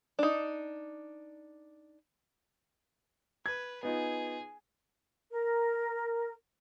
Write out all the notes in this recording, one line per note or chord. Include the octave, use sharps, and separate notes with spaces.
D4 D#4
B4 G#6
B3 D#4 F4 G#4
A#4